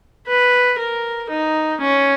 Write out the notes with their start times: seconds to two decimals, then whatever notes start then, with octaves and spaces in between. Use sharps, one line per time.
0.27 B4
0.78 A#4
1.30 D#4
1.81 C#4